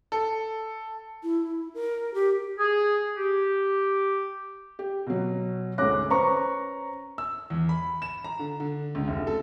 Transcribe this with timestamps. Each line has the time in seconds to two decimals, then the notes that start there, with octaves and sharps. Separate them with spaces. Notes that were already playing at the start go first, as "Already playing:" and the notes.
0.12 A4
1.23 E4
1.74 A#4
2.14 G4
2.59 G#4
3.17 G4
4.79 G4
5.06 B2 F#3
5.78 D2 G#2 C#4 D6 F#6 A#6
6.10 C#4 B4 C5 A#5 C#6
7.18 E6
7.50 E2
7.69 B5
8.02 E7
8.24 A#5
8.39 D3
8.60 D3
8.95 C#2
9.08 F1
9.27 A4